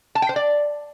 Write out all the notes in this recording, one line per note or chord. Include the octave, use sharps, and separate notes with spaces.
A5
G5
C5
D5